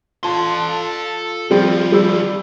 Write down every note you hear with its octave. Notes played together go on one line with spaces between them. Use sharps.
F4 A4 A5 C6
D#3 F3 G3 C4
G3 E6